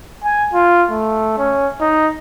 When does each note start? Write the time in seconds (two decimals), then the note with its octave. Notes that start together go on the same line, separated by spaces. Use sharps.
0.24 G#5
0.54 F4
0.91 A3
1.39 C#4
1.81 D#4